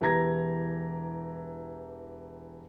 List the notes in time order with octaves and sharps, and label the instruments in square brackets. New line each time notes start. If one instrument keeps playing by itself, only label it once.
[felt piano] E1 E3 G4 A#5 G#6 A#6